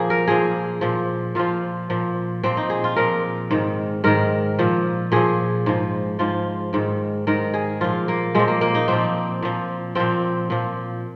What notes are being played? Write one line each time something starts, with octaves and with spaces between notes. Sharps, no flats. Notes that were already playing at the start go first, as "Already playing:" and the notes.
Already playing: A#2 F3 A#3 G#4
A#4
A#2 F3 G#4
A#2 F3
A#2 F3 F4
A#2 F3
A#2 F3 C4
D#4
G#4
F4
A#2 F3 A#4
G#2 D#3
G#2 D#3 A#4
A#2 F3
A#2 F3 G#4
G#2 F3
G#2 F3 F4
G#2 D#3
G#2 D#3 A#4
G#4
A#2 F3 F4
A#3
A#2 F3 G#3
A#3
A#3
D#4
A#2 F3 C4
A#2 F3
A#2 F3 C4
A#2 F3